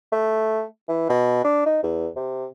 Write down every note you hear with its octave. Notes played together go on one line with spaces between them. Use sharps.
A3
E3
B2
D4
D#4
E2
C3